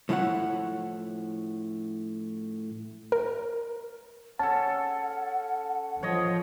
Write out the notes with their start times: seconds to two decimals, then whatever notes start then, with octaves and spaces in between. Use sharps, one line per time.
0.09 A2 F3 E4 C#5 F#5
3.12 A#4
4.40 C#4 A4 F#5 A5
6.03 F3 C#5 D#5